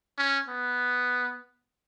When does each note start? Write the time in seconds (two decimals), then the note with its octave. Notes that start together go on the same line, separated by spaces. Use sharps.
0.18 C#4
0.49 B3